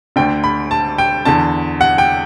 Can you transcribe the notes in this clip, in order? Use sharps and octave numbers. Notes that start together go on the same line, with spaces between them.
D2 D3 G5
B5
A5
G5
E2 D3 A5
F#5
G5